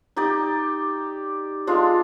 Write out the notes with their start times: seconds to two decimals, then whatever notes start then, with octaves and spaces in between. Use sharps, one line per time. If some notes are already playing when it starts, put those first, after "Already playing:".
0.16 D#4 G4 D5
1.67 G#3 D4 F4